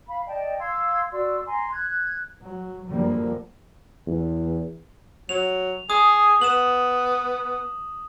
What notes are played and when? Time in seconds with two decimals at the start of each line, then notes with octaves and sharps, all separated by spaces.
0.07 F5 B5
0.26 D5 D#5 G5 A5
0.59 F5 C6 E6 G#6
1.11 F#4 D5 C6 E6
1.46 G#5 A#5 C6
1.72 F#6 G#6
2.42 F#3
2.88 F#2 D3 F3 G3 A#3
4.06 E2
5.29 F#3 F7
5.90 G#4 D#6
6.41 B3 E7 F#7